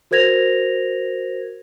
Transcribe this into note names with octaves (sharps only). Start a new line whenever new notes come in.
F#4 A#4 C5 G#6 A#6 F7